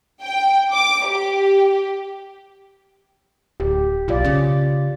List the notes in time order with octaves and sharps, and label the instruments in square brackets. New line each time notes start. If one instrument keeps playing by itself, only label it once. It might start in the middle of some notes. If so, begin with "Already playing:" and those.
[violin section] G5
D6
G4
[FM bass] D1 [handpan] G4
[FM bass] B1 [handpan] F4 D5
[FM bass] C#3